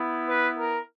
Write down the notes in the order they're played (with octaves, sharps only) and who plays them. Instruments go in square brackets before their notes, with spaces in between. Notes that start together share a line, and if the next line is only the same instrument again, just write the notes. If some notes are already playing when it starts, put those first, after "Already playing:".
Already playing: [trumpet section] B3 E4
B4
A#4